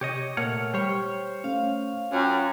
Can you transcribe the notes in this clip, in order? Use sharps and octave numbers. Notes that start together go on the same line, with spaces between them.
C3 G4 C#5 D#5
A#2 A3 C#5 F#5 F6
G3 C5 C#5
A3 C#4 F5
F#2 C#4 F4 G5